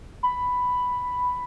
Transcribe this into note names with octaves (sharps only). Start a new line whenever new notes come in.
B5